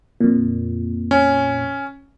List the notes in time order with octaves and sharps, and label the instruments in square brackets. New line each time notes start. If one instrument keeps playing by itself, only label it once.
[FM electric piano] F2 A#2
[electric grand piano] C#4